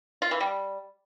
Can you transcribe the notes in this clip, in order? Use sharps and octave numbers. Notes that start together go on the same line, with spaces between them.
F4
E3
G3